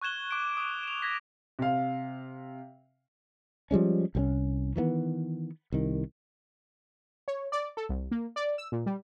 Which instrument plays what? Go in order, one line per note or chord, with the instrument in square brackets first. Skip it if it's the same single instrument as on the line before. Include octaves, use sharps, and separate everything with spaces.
[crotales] C#6 F#6 G#6 E7 G7
D6 D7
D#6
E7 F7
G#6 A#6 B6
[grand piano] C3 F5
[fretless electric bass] F3 G3 G#3 C#4
C2 F3 C#4
D#3 E3 A3 B3
C2 D#3
[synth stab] C#5
D5
A4
C2
A#3
D5
E6
A#2
G3